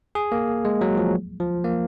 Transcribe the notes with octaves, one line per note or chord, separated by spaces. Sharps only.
G#4
A#3
G#3
F#3
F3
F3
A#3